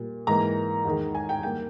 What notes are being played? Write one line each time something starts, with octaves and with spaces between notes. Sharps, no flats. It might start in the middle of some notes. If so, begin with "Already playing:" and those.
Already playing: A#2 G3 A#3
G#2 E3 A#3 A#5
E2 D#3 G#3
G#5
G5
G2 D#3 A#3 G5